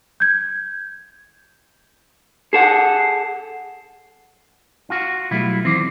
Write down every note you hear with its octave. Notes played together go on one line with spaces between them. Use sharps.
G6 G#6
G#4 A4 F#5
F4 F#4
B2 F#3 G3 A3 E4 F4
D#3 E3 C4 D6 A#6